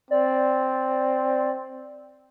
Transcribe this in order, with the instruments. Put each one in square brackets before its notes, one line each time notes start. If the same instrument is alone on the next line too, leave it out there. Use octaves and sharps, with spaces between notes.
[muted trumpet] C4 [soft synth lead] D5